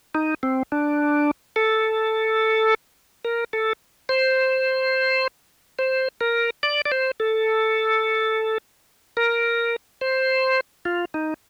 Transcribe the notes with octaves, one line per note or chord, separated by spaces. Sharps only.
D#4
C4
D4
A4
A#4
A4
C5
C5
A#4
D5
D5
C5
A4
A#4
C5
F4
D#4